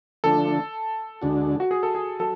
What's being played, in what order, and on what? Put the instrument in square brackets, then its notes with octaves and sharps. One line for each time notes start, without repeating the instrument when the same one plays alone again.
[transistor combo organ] D3 F3 A3 D4 [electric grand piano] A4
[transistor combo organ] D2 D3 G#3 D4 F#4
[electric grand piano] F#4
G#4
A4
G#4
[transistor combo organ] F#3 [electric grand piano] A4